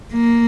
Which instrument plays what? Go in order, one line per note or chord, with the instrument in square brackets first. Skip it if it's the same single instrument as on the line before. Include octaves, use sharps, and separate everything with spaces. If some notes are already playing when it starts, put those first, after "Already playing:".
[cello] A#3